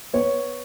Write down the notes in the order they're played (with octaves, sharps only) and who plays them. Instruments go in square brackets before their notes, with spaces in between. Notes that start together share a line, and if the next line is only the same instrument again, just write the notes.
[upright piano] B3 C#5